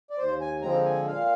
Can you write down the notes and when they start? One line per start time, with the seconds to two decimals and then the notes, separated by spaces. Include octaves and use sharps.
0.10 D5
0.18 D#2 C5
0.41 G#5
0.62 D3 F3 G#3 C4 A#5
0.85 G#5
1.07 A#2 F5